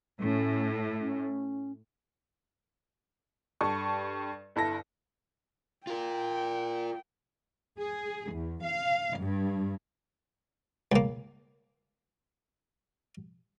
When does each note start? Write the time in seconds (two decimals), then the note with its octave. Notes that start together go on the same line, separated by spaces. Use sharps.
0.22 A2 C#4
1.00 C#4
3.61 G2 A4 C#6
4.56 G1 E4 A4 A#6
5.87 F4 A#4 G5
7.79 G#4
8.32 E2
8.64 F5
9.19 G2
10.92 C#2 A#3